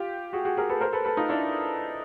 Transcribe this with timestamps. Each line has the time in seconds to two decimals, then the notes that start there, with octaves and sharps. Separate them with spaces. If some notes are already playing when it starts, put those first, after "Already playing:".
Already playing: F4 G4
0.33 F#4 G#4
0.45 F#4 G#4
0.57 G#4 A#4
0.69 A4 B4
0.81 A#4 C5
0.93 A4 B4
1.05 A4 B4
1.17 D#4 F4
1.29 D4 E4